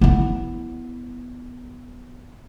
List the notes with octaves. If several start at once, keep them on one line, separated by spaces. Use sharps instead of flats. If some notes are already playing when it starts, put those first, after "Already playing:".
B3 E4